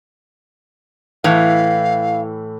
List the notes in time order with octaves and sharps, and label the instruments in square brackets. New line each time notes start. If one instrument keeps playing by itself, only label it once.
[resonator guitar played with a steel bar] A2 E3 [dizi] F5